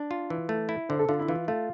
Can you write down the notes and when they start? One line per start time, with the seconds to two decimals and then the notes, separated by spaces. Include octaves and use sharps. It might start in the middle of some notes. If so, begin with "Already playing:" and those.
Already playing: D4
0.11 F4
0.30 E3
0.49 A3
0.69 E4
0.89 D3 C5
0.99 A4
1.08 D3 F4
1.19 E4
1.28 E3 F4
1.48 A3 F4